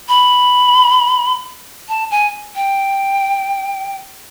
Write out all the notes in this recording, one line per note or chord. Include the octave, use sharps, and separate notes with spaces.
B5
A5
G#5
G5